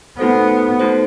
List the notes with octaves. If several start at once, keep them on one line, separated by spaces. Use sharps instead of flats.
A3 B3 D#4 F#4 A4 C5
A3 D#4 F#4 A4 C5